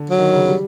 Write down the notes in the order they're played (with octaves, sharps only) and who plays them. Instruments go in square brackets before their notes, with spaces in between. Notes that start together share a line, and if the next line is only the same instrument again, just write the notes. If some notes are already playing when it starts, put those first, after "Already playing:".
Already playing: [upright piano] D3
[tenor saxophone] F#3
[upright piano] D#3
C#3
G3